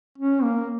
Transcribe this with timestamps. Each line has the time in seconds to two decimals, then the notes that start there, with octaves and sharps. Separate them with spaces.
0.18 C#4
0.43 A#3